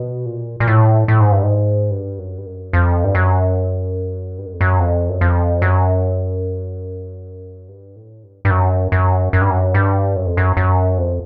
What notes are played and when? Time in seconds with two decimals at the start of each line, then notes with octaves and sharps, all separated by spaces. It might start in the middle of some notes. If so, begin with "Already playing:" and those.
Already playing: B2
0.26 A#2
0.60 A#2
0.67 A2
1.08 A2
1.20 G#2
1.32 G2
1.43 G#2
1.91 G2
2.18 F#2
2.38 G2
2.46 F#2
2.73 F2
3.04 G2
3.15 F#2
4.38 G2
4.46 F#2
4.53 F2
4.61 F#2
4.79 F2
5.09 F#2
5.21 F2
5.62 F#2
7.68 G2
7.96 A2
8.23 G2
8.45 G2
8.50 F#2
8.92 F#2
9.33 F#2
9.41 G2
9.50 F#2
9.74 G2
10.16 F#2
10.27 F2
10.37 F#2
10.57 F#2
10.98 F2